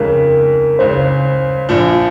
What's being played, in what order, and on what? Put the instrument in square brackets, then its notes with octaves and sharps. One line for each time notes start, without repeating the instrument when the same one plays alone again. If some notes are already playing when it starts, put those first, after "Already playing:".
Already playing: [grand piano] F2 C#3 G#3 D#4 [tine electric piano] A#4
[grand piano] C#2 C#3 G#3 [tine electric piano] C5
[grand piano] A#1 A#2 F3